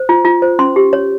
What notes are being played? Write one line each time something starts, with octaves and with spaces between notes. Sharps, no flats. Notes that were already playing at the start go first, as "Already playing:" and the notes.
Already playing: C5
F4
F4
C5
C#4 C6
G4
C#5